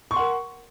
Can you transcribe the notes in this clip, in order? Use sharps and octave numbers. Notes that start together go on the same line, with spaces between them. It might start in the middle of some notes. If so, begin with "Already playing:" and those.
A#4 F#5 C6 C#6